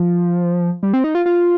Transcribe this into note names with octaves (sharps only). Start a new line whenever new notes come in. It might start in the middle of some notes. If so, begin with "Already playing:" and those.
Already playing: F3
G3
C4
D#4
F4
F4